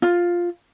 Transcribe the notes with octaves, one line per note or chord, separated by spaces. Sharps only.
F4